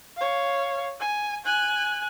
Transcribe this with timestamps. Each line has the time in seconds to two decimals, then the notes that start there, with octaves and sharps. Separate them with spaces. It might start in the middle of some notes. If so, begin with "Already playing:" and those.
0.16 C#5 F5
1.00 G#5
1.45 G#5 F#6